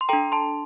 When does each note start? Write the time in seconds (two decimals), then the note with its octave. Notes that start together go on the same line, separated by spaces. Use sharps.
0.01 C6
0.09 D4 A4 G5 A#5
0.32 A5 C6